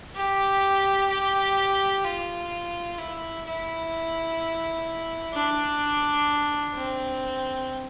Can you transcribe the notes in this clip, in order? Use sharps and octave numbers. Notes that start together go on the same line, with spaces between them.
G4
G4
F4
E4
E4
D4
C4